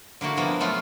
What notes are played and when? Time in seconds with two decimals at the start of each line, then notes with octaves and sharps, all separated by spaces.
0.21 D3 A#3 E4 F#4
0.37 C3 F3 G3 A#3 B3
0.60 F#3 A3 B3 F4